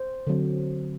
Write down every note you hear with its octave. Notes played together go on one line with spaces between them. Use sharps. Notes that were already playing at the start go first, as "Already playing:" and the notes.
Already playing: C5
D3 F#3 C4